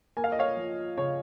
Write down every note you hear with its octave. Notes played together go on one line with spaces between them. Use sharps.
A#3 G#5
F5
D#5
C#5 F5
F3
C#3 C#5